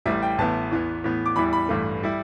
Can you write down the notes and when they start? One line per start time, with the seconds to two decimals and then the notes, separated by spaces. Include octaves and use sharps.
0.06 A1 A2 G3 E5
0.22 G5
0.38 A1 A2 E3 B3 E4 A5
0.71 E2 E3 B3
1.04 A2 E3 B3
1.26 D6
1.36 E2 E3 G3 E4 B5
1.53 B5
1.69 A1 G2 E3 A3
2.03 G3 E4